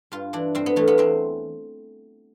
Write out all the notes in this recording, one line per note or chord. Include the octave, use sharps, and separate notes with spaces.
G2 F4
E3 D4
G2 C4
B3
E3 A3
B3
E2 C4